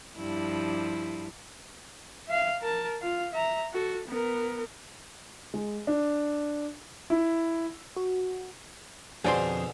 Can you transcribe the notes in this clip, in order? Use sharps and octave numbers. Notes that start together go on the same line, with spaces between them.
G2 F3 E4
E5 F5
A#4 A5
F4 F5
E5 A#5
F#4 A4
B3 A#4
G#3
D4
E4
F#4
F2 B2 D3 D4 G#4 C5 G#5 C6